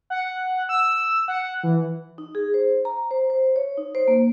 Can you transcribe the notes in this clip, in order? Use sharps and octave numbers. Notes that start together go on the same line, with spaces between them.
F#5
E6
F#5
E3
D#4
G#4
C5
A#5
C5
C5
C#5
D#4
C5
A#3